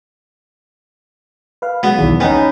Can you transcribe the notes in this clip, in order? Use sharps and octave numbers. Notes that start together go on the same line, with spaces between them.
B4 F5
F#3 G#3 B3
B1 E2 D#3 E4
B3 C#4 D#4 G5